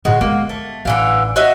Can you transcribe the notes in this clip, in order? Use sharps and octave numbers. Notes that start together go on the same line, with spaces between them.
A2 D3 G#3 F#4
G#3 A#3 B3
A3
A1 D3 E3 F5
F#4 D#5 E5